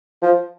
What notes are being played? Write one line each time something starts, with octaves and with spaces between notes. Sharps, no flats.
F3